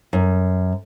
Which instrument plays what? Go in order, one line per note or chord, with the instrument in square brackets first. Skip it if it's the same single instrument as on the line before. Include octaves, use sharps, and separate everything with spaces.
[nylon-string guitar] F#2